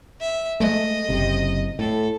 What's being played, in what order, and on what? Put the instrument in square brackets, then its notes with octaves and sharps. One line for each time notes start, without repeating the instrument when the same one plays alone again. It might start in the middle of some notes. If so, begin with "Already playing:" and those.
[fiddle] E5
[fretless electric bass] G#3 A3 [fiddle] D#5
[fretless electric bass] F#1 C3
[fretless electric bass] A2 [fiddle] A4